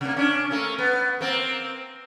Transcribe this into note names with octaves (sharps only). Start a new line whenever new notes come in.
C3 A#3
C#4 D4
A3 A#3 C#4
B3
A#3 C4